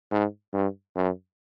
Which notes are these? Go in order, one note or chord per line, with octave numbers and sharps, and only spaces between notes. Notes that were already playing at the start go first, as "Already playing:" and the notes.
G#2
G2
F#2